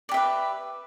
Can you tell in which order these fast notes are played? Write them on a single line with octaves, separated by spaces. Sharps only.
D5 G4 E5 B4